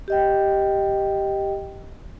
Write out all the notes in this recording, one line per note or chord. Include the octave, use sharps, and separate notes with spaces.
G4 D#5 G5